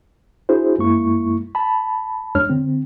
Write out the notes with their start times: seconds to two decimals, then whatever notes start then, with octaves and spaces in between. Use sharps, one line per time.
0.49 D4 E4 F#4 G#4 C5
0.78 F#2 G#3 A#3 E4 C#6
1.55 A5 B5
2.35 F2 G#3 D4 C#5 F6
2.50 D3 C4